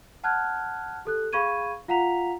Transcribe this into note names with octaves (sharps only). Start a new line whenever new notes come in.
F#5 A5 F6 F#6 G#6
G4 A4 F#6
G#4 F5 B5 C#6 G#6 D#7
F4 F5 F#5 A#5 B6 F7